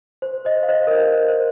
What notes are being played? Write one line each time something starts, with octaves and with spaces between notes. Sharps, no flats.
C5
C5 D#5
F5
C5 D#5
A#4
C5
C5